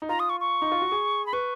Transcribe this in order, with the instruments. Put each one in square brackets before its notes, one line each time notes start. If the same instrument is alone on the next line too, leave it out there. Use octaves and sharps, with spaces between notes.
[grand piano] D#4
[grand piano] F4 [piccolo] A#5
[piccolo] D#6
C#6
C#6
[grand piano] D#4
F4
F#4
G#4
[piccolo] B5
[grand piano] B4 [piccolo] C#6